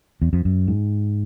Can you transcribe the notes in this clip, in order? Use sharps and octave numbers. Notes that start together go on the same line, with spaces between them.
E2
F2
F#2
G#2